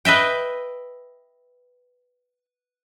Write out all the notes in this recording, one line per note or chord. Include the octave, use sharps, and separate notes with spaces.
B4 D#5 E5 G5